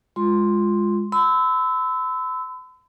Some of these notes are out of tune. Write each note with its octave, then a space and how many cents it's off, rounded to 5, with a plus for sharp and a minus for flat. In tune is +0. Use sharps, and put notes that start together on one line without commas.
G#3 -10 F4 +0 C6 +0
B5 +45 E6 -10